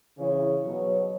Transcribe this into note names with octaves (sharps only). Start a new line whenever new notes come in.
C#3 E3 C#5
B2 F#3